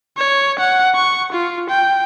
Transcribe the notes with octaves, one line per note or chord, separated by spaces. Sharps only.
C#5
F#5
C#6
F4
G5